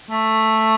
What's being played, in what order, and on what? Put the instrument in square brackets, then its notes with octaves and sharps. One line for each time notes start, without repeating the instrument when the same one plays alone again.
[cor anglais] A3